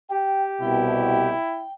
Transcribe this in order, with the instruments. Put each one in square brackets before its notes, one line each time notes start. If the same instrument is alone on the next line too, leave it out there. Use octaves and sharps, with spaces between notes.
[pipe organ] G4 [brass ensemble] G5
[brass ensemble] C2 B2 [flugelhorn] E4 [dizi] G5